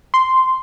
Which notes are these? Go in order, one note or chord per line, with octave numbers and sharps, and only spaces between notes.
C6